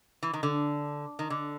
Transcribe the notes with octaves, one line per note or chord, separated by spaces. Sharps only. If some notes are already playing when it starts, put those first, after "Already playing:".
E3
D#3
D3
D#3
D3